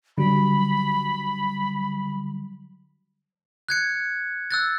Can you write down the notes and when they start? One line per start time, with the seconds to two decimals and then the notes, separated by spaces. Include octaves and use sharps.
0.17 D3 F#3 G3 B5
3.69 F#6 G#6 C#7
4.51 E6 F#6 A6